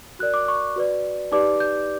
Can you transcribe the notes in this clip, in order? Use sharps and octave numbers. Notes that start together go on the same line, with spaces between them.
F#4 A#4 D5 F#6
D6
C#6
F#4 B4 D5
D#4 G4 B4 D5 D6
G6